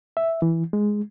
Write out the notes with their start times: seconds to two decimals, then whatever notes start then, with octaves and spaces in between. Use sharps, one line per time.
0.17 E5
0.42 E3
0.73 G#3